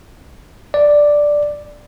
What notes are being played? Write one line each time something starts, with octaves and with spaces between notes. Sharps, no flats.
D5